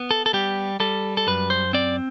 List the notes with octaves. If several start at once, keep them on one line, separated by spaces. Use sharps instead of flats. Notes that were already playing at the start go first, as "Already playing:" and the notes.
Already playing: B3
A4
A4
G3 G4
G3 A4
A4
F#2 B4
C5
C4 D5